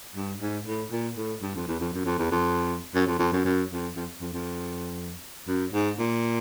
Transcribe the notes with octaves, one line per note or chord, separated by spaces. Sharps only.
G2
G#2
A2
A#2
A2
G2
F2
E2
F2
F#2
F2
E2
F2
F#2
F2
F2
F#2
F#2
F2
F2
F2
F2
F#2
G#2
A#2